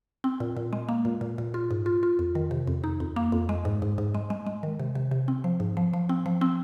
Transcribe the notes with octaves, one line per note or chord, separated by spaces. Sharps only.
C4
A#2
A#2
G#3
A#3
A#2
A#2
A#2
F4
G#2
F4
F4
F2
D#3
C3
F2
D#4
F2
A#3
F2
G#3
G#2
G#2
G#2
G#3
G#3
G#3
D#3
C3
C3
C3
C4
F3
G#2
F3
F3
C4
F3
C4